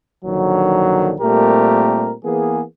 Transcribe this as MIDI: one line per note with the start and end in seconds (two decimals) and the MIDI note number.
0.25 1.13 34
0.25 1.13 50
0.25 1.13 51
0.25 1.13 53
0.25 1.13 54
1.21 2.13 46
1.21 2.13 55
1.21 2.13 57
1.21 2.13 60
1.21 2.13 67
1.21 2.13 70
2.24 2.62 52
2.24 2.62 58
2.24 2.62 59
2.24 2.62 68